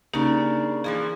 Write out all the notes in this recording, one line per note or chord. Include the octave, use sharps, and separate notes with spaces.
C#3 A#3 D4 D#4 G4 A#4
E3 F3 A#3 G#4